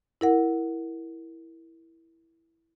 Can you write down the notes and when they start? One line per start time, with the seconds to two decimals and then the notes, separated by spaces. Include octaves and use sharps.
0.21 E4 A#4 F#5